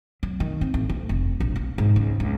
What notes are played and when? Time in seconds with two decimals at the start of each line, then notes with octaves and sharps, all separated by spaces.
0.23 F#3
0.40 D#3
0.61 C4
0.74 A1
0.90 D2
1.09 F1
1.40 A#1
1.56 A#3
1.78 G#2
1.96 C#2
2.20 C#2